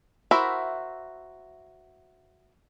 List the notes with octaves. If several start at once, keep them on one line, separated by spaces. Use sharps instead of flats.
E4 F#4 A#4 C5 E5